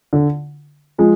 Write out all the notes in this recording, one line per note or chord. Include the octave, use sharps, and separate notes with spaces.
D3
F3 G#3